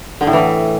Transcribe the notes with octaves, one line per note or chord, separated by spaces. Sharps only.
D3
A2
E3